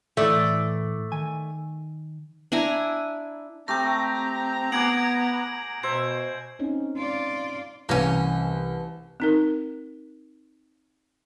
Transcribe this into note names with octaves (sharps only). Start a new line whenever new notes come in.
A2 E3 A3 D5
D#3 G#5
D4 E4 G#5 A#5
A3 C4 G4 A#5 G6 A#6
B3 G#4 F#5 D6 G#6 D7 F#7
B2 C5 E5 G#6
C4 C#4 D#4
F4 D5
C2 E3 A#3 C#4
C4 D#4 A#4